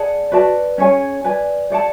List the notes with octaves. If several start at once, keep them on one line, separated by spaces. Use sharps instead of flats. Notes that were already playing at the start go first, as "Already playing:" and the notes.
Already playing: G#4 D5 F#5 A5
F#4 B4 D5 A5
C#4 G#4 C#5 G#5
B4 D5 G#5
G#4 D5 F#5 A5